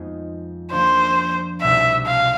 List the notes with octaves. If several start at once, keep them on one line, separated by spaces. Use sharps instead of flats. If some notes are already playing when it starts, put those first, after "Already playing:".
Already playing: F2 F3 G#3 B3 D#4
F3 A#3 D4 C5
C2 B2 G3 B3 E5
F5